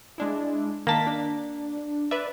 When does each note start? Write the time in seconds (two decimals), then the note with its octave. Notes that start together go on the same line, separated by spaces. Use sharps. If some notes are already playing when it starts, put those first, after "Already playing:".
0.18 G#3 D4 E4
0.87 D#3 A#3 A5 B6
1.07 D4
2.11 B4 D5 E5